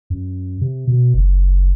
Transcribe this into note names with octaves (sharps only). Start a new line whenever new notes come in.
F#2
C3
B2
F#1